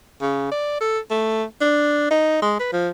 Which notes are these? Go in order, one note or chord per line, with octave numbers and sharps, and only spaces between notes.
C#3
D5
A4
A3
D4
D#4
G#3
B4
F3